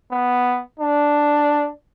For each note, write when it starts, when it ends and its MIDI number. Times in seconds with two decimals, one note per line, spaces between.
0.12 0.62 59
0.80 1.70 62